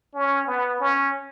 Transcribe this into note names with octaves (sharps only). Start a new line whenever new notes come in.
C#4
B3
C#4